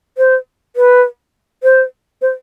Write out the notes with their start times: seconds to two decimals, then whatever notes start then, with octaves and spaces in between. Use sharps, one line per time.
0.18 C5
0.76 B4
1.63 C5
2.22 C5